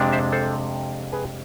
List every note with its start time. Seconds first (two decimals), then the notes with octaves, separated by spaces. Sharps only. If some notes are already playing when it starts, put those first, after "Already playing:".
Already playing: F2 C3 G#3 D4
0.12 C5 E5
0.32 A4 C5
1.12 G#4 B4